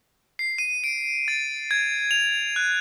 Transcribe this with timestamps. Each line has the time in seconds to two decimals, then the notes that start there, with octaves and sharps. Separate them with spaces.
0.39 C7
0.58 D#7
0.84 D7
1.28 A6
1.71 G#6
2.11 F7
2.56 F#6